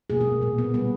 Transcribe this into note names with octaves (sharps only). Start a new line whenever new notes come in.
B2 A#3 G#4
A#3
A#2 A#3
B3
B2 G3 A#3 B3